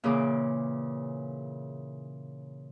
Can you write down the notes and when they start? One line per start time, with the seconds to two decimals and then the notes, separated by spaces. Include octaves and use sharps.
0.03 A#2 C#3 E3 A#3 G#4 D6